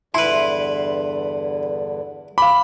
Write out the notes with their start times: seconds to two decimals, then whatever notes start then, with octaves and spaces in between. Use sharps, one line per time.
0.14 E2 G2 D3 E4 B4 C6
2.38 F5 B5 D6